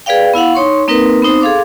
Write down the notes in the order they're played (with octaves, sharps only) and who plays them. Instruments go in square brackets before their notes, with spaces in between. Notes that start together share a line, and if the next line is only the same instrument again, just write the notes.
[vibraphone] G#4 B4 D5 F5 G5
B3 E4 F5 F#5
D#4 C#5 C6 C#6
A#3 C4 D#4 A#4 B4
B3 C4 D#4 C5
G#4 A4 F5 C6 D6